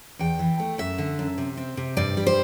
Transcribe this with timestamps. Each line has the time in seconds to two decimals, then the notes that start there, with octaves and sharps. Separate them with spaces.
0.19 E2 G5
0.39 E3
0.60 A3
0.78 F#2 E5
0.98 D3
1.19 F#2
1.38 C3
1.57 C4
1.77 C3
1.97 G2 D5
2.17 G3
2.27 C5